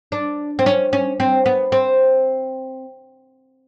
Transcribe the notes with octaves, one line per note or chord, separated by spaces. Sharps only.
D4
C4
C#4
C#4
C4
B3
C4